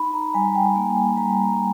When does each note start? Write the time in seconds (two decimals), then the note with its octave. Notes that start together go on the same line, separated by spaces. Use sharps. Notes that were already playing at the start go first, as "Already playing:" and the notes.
Already playing: D#4 B5
0.14 A#5
0.34 G3 G#5
0.55 G5
0.76 A#3 G#5
1.17 G3 A#5